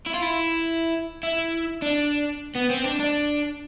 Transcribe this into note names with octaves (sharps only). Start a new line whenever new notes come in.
E4
F4
E4
E4
D4
B3
C4
D4
D4